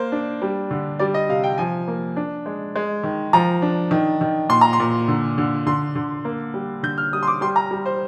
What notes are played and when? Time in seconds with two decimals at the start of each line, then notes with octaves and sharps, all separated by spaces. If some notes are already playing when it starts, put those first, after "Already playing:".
Already playing: A#3 C5
0.12 D4
0.42 G3
0.71 D3
0.99 G3 D5
1.14 D#5
1.29 C3 F5
1.44 G5
1.58 F3 G#5
1.88 A#3
2.16 D4
2.46 G#3
2.76 G#3
3.03 D#3
3.33 F3 A#5
3.62 D4
3.91 D#3
4.21 D#3
4.49 A#2 C6
4.61 A#5
4.73 C6
4.80 A#2
5.08 D3
5.38 D3
5.66 D3 C6
5.95 D3
6.25 A#3
6.54 G3
6.83 D3 G6
6.98 F6
7.13 G3 D#6
7.23 C6
7.27 D6
7.41 G3 C6
7.56 A#5
7.71 G3
7.86 C5